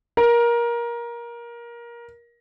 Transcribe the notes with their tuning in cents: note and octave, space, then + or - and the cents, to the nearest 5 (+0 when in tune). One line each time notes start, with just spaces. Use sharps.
A#4 +20